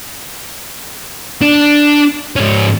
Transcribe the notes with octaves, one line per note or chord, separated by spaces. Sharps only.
D4
G#2 C#4